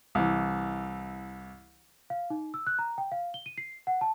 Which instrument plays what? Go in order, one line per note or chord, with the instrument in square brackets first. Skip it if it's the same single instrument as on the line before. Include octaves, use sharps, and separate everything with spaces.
[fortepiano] C2 E3
[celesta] F5
D#4
E6
F#6
A#5
G5
F5
G7
D#7
C7
F#5
A5